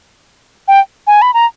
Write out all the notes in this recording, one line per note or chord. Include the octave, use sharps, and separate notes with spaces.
G5
G#5
B5
A#5